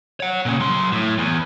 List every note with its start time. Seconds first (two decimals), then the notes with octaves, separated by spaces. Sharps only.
0.20 C#5 F#5
0.46 A#2 C#3
0.60 F#3 C6
0.93 A2
1.18 E2